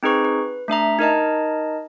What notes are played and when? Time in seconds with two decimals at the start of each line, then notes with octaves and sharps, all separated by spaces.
0.03 C4 D#4 G#4 B4 C#6
0.25 B4
0.68 A3 D4 E5 A#5
0.99 D#4 A#4 D#5 A5